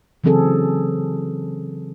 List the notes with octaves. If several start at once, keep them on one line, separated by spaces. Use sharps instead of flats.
C#3 E3 F#3 C4 G#4 A4